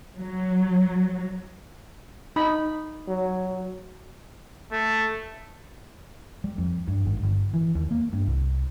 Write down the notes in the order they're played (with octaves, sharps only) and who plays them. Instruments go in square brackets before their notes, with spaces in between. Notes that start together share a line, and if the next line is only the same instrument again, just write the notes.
[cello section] F#3
[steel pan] D#4 B5
[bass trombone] F#3
[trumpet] A3
[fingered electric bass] G3
F2
G2
G#1
G1
E3
D#2
A#3
G2
C2